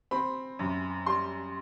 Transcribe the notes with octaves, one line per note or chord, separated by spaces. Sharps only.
C4 B5
F#2
G3 C6